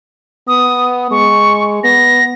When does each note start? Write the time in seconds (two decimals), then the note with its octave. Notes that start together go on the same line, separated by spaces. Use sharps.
0.48 B3 D#6
1.11 G#3 C#6
1.84 B3 A#6